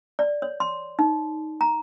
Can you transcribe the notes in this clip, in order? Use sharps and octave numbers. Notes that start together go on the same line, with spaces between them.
D5
C#5
C6
D#4
A#5